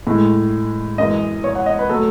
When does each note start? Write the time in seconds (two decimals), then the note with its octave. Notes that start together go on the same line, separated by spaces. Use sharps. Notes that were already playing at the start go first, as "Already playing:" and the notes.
0.07 A2 G#3
0.98 F#2 E3 G#3 D#5
1.44 C#5
1.55 F#5
1.66 D#5
1.79 B4
1.89 F#3 A3 A4